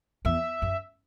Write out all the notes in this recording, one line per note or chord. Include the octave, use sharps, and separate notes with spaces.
E2 E5
F#2